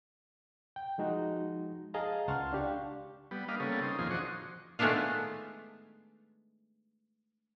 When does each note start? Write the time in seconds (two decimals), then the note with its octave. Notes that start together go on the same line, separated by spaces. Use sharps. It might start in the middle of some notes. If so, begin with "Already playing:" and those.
0.76 G5
0.98 F3 G#3 D#4 F#4
1.94 G#4 D#5 F5 A5 A#5
2.28 C#2 F#5 A5 C6 C#6 F6
2.53 D4 G4 F5 C#6
3.31 G3 B3
3.48 A#3 D4 B4 D#5 F5
3.60 C#3 G3 A#3 B3 C#4 A4
3.83 C4 C#4 D#4
3.99 F2 A#2 D#3 F3 G#4 C6
4.11 D4 F#4 C5 D#5 C#6
4.79 D#3 G#3 A3 B3 D4 F4